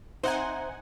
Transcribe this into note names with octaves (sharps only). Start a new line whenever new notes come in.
C4 D#4 C5 E5 F#5 G#5 A#5